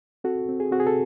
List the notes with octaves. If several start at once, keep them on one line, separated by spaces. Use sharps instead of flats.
C4 F#4 A4
C4
G#4
C4 F#4
G#4
A4